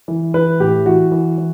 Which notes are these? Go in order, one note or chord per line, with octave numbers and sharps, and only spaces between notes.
E3
E3 B4
A2 G4
E3 F#4
E3
E3